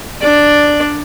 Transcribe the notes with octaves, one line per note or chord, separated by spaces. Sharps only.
D4 D5